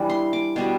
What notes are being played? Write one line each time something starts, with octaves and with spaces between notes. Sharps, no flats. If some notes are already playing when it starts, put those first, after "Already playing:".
Already playing: E3 G3 D4
C6
D6
B2 G3 D4 C6